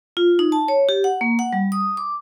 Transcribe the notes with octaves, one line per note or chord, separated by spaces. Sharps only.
F4
D#4
A5
C#5
G4
F#5
A#3
F#5
G3
D#6
D6